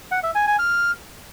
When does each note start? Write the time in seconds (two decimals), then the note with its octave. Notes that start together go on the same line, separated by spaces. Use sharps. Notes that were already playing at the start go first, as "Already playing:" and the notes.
0.11 F#5
0.23 E5
0.35 G#5
0.47 G#5
0.59 F6